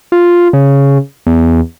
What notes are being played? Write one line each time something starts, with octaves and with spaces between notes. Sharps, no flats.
F4
C#3
E2